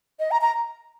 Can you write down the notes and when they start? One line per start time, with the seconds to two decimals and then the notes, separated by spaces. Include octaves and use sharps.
0.20 D#5
0.31 A#5
0.41 A#5